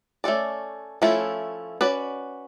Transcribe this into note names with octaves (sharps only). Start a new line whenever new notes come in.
A3 C#4 F#4 A4 D5
F3 A3 C#4 E4
C#4 F#4 B4 D5